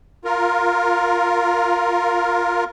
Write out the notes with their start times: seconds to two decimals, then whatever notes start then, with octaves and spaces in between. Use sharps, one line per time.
0.24 F4 A#4